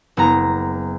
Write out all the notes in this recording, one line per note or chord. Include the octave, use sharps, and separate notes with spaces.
F#1 B3 A#5